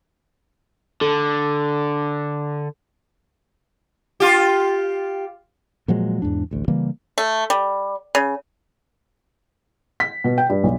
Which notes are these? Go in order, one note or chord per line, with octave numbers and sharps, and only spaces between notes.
D3 A4
F4 G4
A#2 F3 F#3 G#3
E2 G#2 D4
A1 D2
C#3 E3 G3 A#3
A3
G3
C#3
B6
B2
G5
G2
B1